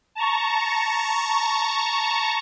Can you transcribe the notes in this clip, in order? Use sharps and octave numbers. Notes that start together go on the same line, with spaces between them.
A5 A#5 C#6